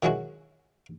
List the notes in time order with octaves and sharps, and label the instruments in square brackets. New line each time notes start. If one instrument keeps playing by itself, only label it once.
[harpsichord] D#3 F#3 G#3 E4 F#4